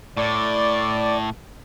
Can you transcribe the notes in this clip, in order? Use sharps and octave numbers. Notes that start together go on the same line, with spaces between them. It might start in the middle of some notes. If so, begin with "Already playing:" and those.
A2 D5